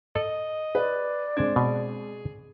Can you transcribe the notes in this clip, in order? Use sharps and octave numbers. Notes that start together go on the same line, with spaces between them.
A4 D#5
B4 D5
G#3 C4 D4 G#6
B2 G#4